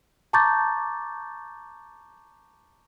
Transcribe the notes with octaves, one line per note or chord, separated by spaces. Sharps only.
A5 A#5 C#6 D6 G6 A6